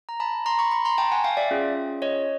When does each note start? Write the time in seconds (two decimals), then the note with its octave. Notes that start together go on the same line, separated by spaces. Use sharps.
0.09 A#5
0.20 A5 B5
0.46 A#5 C6
0.59 B5 C#6
0.71 B5 C#6
0.85 A#5 C6
0.98 G5 A5
1.12 F#5 G#5
1.24 F5 G5
1.37 D5 E5
1.51 C#4 F4 G#4
2.02 C#5 D#5